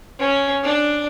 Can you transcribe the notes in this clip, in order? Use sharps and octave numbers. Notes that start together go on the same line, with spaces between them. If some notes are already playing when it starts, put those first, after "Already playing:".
C#4
D4